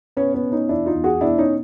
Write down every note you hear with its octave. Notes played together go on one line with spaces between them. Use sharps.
B2 B3 C#4
B3 C#4
B2
C#4 D#4
E2 D4 E4
D#4 F4
E2
F#4 G#4
B2 D4 E4
C#4 D#4